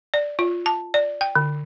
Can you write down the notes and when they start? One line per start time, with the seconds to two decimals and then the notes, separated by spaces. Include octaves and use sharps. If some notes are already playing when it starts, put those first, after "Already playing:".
0.14 D5
0.39 F4
0.66 A5
0.94 D5
1.21 G5
1.35 D3